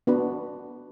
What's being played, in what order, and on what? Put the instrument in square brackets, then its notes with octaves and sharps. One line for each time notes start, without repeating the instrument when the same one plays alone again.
[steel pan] B3 D4 F#4 B4